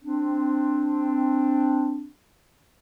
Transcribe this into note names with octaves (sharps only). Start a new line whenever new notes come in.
C4 D4